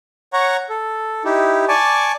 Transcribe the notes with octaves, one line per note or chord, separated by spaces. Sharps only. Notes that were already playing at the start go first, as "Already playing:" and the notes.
C#5 F#5 A#5 C#6
A4
D#4 E4 G4
D5 G#5 A5 C#6 D6